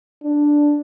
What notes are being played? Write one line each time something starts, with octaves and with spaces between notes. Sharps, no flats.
D4